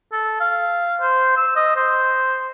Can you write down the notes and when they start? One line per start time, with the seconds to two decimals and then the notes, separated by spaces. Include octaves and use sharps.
0.13 A4
0.40 F5
1.02 C5
1.37 E6
1.56 D#5
1.76 C5